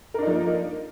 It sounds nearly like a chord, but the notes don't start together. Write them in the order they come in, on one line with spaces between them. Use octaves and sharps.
A#4 D4 D#4 F3 A#3